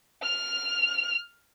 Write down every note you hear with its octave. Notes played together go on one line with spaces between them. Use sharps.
F6 F7